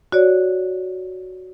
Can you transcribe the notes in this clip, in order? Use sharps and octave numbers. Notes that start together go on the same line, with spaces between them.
F#4 C#5 D5